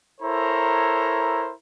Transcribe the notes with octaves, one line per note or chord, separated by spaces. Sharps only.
E4 A4 A#4 C5 C#5 A#5